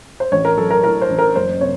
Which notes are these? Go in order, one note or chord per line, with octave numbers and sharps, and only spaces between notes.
C5
A1 C#5
A#4
F#3 A4
A#4
A2 A#4
C5
A1
A#4
F#1 C5
C3 C#5